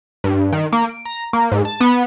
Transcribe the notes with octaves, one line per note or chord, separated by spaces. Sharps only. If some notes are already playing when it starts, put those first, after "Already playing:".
G2
D#3
A#3
D7
A#5
A#3
G#2
A5
B3